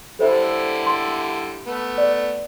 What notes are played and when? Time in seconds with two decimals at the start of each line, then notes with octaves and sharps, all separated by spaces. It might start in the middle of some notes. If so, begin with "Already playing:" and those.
0.19 D3 G3 E4 A4 C5 E5
0.86 C6
1.66 A3 B3
1.98 D5